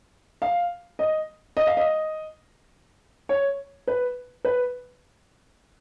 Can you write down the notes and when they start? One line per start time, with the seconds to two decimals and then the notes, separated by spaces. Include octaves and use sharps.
0.42 F5
0.99 D#5
1.57 D#5
1.67 F5
1.77 D#5
3.29 C#5
3.87 B4
4.45 B4